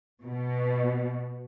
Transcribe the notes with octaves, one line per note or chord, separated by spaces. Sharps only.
B2